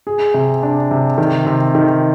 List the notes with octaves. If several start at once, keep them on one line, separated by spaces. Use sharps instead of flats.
G#4
C3
D4
C3
D#3
C3
D#3